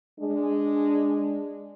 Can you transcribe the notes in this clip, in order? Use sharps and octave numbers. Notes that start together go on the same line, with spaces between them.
G#3 D4